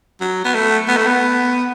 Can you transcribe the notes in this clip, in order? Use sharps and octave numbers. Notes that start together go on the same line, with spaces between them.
F#3
B3
A3
B3
A3
B3